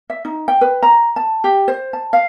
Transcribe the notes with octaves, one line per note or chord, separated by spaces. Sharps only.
E5
D#4
G5
B4
A#5
A5
G4
C5
A5
F5